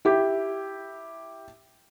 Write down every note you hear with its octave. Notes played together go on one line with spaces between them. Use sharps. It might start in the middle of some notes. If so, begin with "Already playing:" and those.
E4 G4